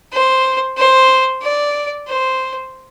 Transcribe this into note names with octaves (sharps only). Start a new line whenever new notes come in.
C5
C5
D5
C5